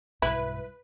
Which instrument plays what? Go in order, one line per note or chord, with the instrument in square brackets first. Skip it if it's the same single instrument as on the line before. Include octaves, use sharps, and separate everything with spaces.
[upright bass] B1 G2 [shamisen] E4 [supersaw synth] B4